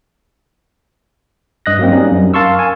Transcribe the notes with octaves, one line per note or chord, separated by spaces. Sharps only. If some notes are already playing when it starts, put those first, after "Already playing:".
G2 D#5 F#6 A#6
F#3 A#3 C4
G3 C#4 D#4
F#2
A#4 F5 A5 C6 C#6 E6
G#5